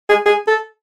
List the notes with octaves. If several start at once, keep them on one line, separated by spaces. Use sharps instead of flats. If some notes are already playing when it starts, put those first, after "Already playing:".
G#4
G#4
A4